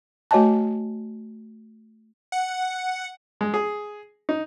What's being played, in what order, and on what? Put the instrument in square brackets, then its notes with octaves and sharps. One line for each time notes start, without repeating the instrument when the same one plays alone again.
[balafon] A3 F#4 C#5 D#5 G#5 A5
[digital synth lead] F#5
[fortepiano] G#3
G#4
D#4